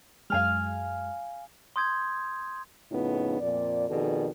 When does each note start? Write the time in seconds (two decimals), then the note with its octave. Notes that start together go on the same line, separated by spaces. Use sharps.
0.30 F#2 G#3 F5 G#5 F6
1.76 C6 D#6 G6 G#6
2.91 F2 A2 C#3 B3 D#4 F4
3.40 F2 A#2 D5
3.88 F2 B2 D#3 G#4 A4 D5